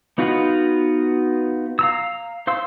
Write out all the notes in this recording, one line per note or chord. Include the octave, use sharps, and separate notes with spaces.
B3 D#4 F4 F#4 B4
F5 A#5 E6
C5 F5 C6 E6